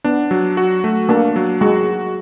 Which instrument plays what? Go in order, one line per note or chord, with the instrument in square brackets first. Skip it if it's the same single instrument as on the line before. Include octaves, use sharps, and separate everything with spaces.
[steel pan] B3 [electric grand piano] D4
[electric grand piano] F#3
F#4
A3
[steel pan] A#3 [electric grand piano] D4
[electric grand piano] F#3
[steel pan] G#3 [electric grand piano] F#4